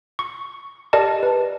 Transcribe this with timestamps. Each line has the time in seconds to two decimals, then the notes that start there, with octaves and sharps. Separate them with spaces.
0.19 C#6
0.93 G4 A#4 D5 D#5 A5
1.23 B4